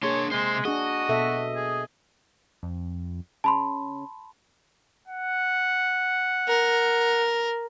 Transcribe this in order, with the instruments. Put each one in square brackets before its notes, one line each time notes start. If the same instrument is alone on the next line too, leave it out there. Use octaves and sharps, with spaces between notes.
[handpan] A#3 G#4 [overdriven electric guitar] D4 C6 [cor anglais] C#5
[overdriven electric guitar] C3 C5 [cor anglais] G#3
[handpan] D4 G#4 [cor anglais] F#4 [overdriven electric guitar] D#5
[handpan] B2 A4 E5
[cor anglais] G#4
[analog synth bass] F2
[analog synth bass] C#3 [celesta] A5 B5 C6
[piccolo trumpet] F#5
[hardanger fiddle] A#4